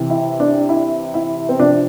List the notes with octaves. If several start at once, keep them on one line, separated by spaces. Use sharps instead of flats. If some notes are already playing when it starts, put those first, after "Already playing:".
Already playing: C3 E3
E4
D4
E4
E4
C4
C3 F3 D4